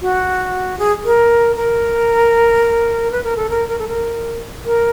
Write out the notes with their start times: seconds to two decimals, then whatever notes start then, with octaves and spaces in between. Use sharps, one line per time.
0.01 F#4
0.79 G#4
1.05 A#4
1.56 A#4
3.11 B4
3.24 A#4
3.37 A4
3.50 A#4
3.68 A#4
3.79 A4
3.88 A#4
4.65 A#4